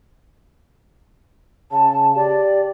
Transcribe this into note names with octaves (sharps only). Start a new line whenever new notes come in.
C#3 A5
G4 D5